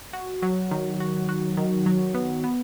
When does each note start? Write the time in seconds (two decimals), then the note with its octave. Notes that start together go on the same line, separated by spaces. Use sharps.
0.13 F#4
0.42 F#3
0.71 D#3
1.00 F#4
1.29 F#4
1.57 D#3
1.86 F#3
2.14 B3
2.44 B3